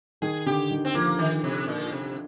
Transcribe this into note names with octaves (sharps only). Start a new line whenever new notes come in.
D#3 G#4
D3 G4
D#3
C4
F3 A#3
D#3
C3
A#2
C3